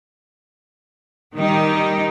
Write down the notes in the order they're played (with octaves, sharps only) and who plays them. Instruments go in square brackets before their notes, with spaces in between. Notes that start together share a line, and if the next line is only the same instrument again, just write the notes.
[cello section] D#3 G3 D#4 G4